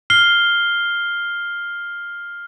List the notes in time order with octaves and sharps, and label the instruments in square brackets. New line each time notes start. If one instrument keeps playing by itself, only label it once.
[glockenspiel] F6 C7 G7